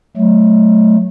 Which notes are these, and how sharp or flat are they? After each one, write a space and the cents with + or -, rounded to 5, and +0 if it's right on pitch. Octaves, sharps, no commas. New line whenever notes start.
F#3 +10 A3 -15